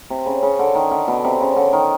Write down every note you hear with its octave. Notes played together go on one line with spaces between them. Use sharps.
C3
C#3
C#3
D3
D#3
D3
B2
C3
C#3
D3
D#3